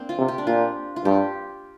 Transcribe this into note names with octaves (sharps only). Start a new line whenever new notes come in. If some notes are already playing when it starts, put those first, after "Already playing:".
Already playing: A#3 C4 D4
F4
C3
G4
D4
A#2 F4
F4
G2 G4